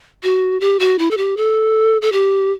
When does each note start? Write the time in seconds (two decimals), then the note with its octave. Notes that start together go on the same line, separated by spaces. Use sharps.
0.23 F#4
0.60 G4
0.79 F#4
0.99 E4
1.11 A4
1.17 G4
1.37 A4
2.02 A4
2.12 G4